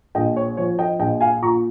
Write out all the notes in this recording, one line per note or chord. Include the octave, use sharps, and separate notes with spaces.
A#1 D#5 G5
C#5
F3 C#5
D#5 G5
A#1 D#5 G5
F5 G#5
A#2 A#5 C#6